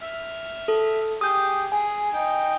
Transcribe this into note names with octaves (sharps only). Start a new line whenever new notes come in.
E5 F6
A4
G4 G#4 D#6 G6
G#4 G#5
D#4 G5